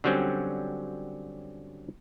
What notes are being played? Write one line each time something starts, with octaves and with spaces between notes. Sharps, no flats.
D3 F#3 G3 C4 C#4